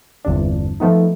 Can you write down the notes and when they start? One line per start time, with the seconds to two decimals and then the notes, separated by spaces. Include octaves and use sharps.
0.25 G1 E2 C3 D4
0.80 F3 A3 B3 D#4